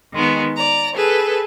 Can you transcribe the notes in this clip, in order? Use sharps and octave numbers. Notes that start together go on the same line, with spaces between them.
D#3 G#3 B3
D5 A#5
G#4 A4 B4